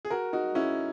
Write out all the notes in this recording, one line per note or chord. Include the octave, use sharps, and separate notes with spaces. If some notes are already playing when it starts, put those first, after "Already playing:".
G#4
F#4 A#4
D#4 F#4
C#4 E4